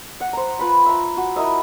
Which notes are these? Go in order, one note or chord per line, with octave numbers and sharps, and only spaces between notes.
F#5
C5 A#5
F4 B4 B5
E5 A#5
F#4
E4 A#4 D#5 E5